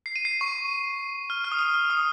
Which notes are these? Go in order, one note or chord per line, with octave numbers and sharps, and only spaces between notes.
C7
D#7
C7
C#6
F6
F6
D#6
F6
F6
D#6